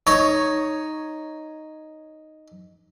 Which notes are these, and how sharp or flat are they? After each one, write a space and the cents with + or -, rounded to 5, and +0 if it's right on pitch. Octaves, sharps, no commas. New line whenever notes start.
D#4 +0 C#5 +0